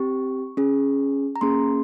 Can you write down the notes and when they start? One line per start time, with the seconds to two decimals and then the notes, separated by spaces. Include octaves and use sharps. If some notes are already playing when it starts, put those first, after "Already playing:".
Already playing: C4 G4 C#6
0.57 C#4 G#4
1.36 A#5
1.41 A#3 C#4 G#4 C6